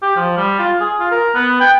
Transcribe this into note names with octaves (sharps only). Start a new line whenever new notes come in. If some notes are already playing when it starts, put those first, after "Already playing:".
G4
F3
G3
F4
G#4
F4
A#4
B3
G5